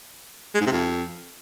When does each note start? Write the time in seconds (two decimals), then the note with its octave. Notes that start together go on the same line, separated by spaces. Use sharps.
0.55 G#3
0.61 G#2
0.66 C3
0.72 F2